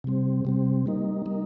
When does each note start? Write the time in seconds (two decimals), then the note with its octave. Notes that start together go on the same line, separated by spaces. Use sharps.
0.04 C3 G3 C4
0.45 C3 G3 C4
0.86 G3 A#3 D#4
1.26 G3 A#3 D#4